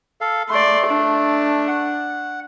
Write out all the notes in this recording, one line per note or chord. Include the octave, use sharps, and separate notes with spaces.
A4 F5
A3 D5 C6
D4
F#5